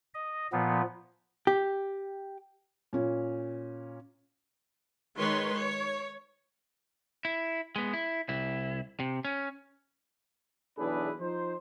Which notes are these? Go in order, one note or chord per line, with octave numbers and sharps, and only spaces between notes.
D#5
A#2 F3 B3
G4
A#2 C#4
D#3 G#3 B4 C#5 C6
C#5
E4
G#3 B3
E4
C2 E4
C3
C#4
B1 E2 D4 E4 G#4 B4
F3 D#4 C5